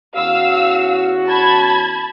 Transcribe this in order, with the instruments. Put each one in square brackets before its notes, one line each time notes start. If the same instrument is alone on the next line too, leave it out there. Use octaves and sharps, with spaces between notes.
[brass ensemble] E2 C#4 F#4 [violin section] F5 E6
[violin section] A5 B5 G#6